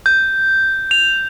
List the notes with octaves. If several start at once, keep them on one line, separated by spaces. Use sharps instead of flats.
G6
F7